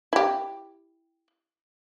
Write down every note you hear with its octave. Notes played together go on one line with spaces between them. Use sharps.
E4 G4